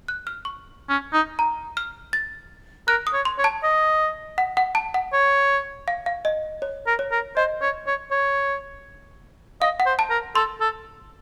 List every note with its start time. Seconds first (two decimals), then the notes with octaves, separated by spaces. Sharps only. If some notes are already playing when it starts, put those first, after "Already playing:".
0.08 F#6
0.27 F6
0.45 C#6
0.89 C#4
1.14 D#4
1.39 A#5
1.77 F6
2.13 A6
2.88 A#4 F#6
3.07 D#6
3.14 C#5
3.25 C6
3.39 C#5
3.44 A5
3.64 D#5
4.38 F#5
4.57 F#5
4.75 A5
4.94 F#5
5.13 C#5
5.88 F5
6.06 F5
6.25 D#5
6.62 C#5
6.87 A#4
6.99 C#5
7.12 A#4
7.37 C5 D#5
7.62 C#5
7.87 C#5
8.11 C#5
9.62 D#5 F5
9.80 F#5
9.86 C5
9.99 A5
10.10 A#4
10.35 A4 C6
10.61 A4